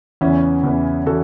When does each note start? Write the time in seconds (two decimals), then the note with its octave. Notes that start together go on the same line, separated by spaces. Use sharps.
0.21 E2 C#3 E3 C#4 E4
0.64 E2 C#3 E3
1.06 C#3 E3 F#4 A4